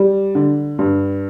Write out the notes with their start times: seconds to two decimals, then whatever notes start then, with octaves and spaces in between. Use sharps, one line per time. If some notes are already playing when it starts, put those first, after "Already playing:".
Already playing: G3
0.35 D3
0.79 G2